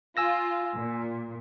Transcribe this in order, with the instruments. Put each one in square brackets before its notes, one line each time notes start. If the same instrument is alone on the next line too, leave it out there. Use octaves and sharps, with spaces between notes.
[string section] F4 [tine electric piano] G#5 E6 A#6
[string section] A#2